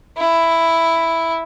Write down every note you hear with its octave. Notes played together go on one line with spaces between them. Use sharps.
E4